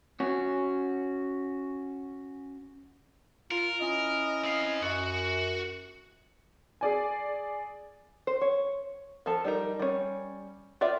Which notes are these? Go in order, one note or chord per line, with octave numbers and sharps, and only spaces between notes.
C#4 F#4
F4 A#4
C#4 E4 D#5
C4 F5
F#2 F#4
G#4 D5 G#5
C5
C#5
F3 F4 A4 A5
G3 D#4 A#4
G3 C#4
F4 A#4 D5 E5 G5